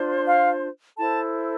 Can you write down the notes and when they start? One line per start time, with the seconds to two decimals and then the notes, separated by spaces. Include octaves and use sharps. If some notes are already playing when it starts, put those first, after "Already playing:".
Already playing: D4 F4 C5
0.26 F5
0.97 E4 A4 C5 A5